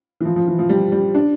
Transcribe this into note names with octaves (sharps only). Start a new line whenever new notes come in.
E3
F3
F3
E3
F3
G3
G3
D4